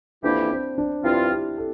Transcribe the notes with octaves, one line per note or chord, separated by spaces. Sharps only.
F2 E3 A#3 D4 E4 G4
C4
D4
G2 F3 C4 E4 F4
G4
A4